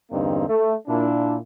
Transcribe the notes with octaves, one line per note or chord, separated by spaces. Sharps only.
E2 G2 D3 A#3 C4 D#4
A3
A#2 D4 E4